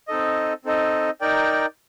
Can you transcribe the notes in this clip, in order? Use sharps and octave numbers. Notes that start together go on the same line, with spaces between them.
C4 D#4 A4 D#5
C4 D#4 A4 D#5
D#4 A#4 D5 G5